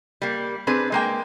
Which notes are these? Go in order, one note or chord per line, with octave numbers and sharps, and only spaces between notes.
G3 A#3
C4 D4 G#4 B4
G#3 A#3 G5